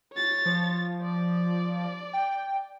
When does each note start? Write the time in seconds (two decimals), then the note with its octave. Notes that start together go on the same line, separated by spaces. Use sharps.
0.13 C#5 A6
0.46 F3
1.03 D5
2.13 G5